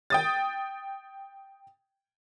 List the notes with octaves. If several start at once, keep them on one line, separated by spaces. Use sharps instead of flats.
G5 D#6 A6